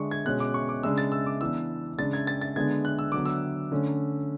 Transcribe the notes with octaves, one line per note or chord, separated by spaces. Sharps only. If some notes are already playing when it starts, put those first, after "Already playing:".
Already playing: D3 G#3 D4 C#6
G#6
B2 G#3 C#4 F#6
D6
C#6
D6
C#3 G#3 D4 E6
A6
E6
D6
E3 B3 D4 E6
C#3 G#3 D4 A6
G#6
A6
A6
D3 G#3 B3 D4 G#6
F#6
E6
D3 F#3 B3 D6
E6
D3 A3 C#4